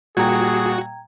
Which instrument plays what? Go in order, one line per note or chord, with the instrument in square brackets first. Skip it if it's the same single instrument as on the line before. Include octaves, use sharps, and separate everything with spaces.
[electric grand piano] A#2 G3 [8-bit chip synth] F#4 [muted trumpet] G#4 [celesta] G5 A#5 G#6